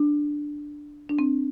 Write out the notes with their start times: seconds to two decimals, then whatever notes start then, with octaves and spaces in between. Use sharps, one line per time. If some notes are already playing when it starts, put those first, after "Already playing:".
Already playing: D4
1.09 D4
1.19 C4